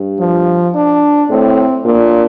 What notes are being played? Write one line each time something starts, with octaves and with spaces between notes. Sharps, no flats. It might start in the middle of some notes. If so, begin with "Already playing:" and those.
Already playing: G2
F3
D4
A2 C4
A#2 D4